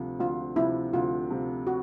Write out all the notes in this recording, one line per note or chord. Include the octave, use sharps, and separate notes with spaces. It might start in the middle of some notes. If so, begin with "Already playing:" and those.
Already playing: D2 C3 F3
D2 F4
C3 F3 E4
D2 F4
C3 F3
F#4